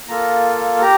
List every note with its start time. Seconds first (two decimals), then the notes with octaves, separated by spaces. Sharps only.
0.08 A#3 F4 A4 A#5
0.82 G4 A#5